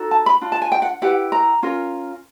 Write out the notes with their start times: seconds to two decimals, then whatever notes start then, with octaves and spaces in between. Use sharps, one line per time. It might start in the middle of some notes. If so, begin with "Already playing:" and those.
Already playing: D#4 F#4 A4
0.11 A5
0.26 B5
0.41 D4 F4
0.52 A5
0.62 G#5
0.72 G5
0.82 F#5
1.02 E4 G4 B4 F#5
1.32 A#5
1.63 C#4 F4 A#4